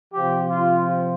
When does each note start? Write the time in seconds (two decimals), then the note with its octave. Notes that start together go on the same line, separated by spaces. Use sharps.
0.13 C3 F3 G4
0.50 F4